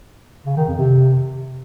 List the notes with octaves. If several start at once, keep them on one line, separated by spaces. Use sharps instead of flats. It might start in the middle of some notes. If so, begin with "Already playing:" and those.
C#3
D#3
F2
C3